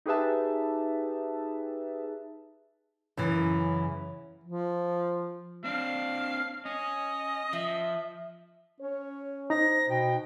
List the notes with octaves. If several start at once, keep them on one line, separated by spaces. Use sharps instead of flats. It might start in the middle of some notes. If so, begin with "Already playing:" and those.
D#4 G4 G#4 B4 E5 A5
F#2 C#3 E3
F3
C4 D4 F5
C#4 D#5
F3 E5
C#4 C#5
D#4 C5 A#6
B2 G5